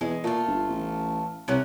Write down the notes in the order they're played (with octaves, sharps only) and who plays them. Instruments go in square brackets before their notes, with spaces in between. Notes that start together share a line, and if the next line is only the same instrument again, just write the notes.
[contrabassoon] E2 [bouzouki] G#3
[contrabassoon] A#2 [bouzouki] A3 F4
[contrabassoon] G1
A1
[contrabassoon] C2 [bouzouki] C3 C#4 F#5